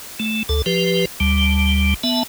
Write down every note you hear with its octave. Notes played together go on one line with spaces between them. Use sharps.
A3
D2 A4
F3 G4 B4
D2 G3
B3 E5 A5